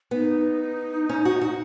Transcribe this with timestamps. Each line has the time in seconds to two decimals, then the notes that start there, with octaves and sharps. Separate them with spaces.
0.11 B3 D#4
1.09 C#4
1.25 F#4
1.41 F#4